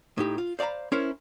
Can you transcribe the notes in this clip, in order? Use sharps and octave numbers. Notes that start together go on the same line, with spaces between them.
A2 D#4 G4
F4
C5 D5 F5 A#5 B5
C#4 E4 A#4 C5 C#5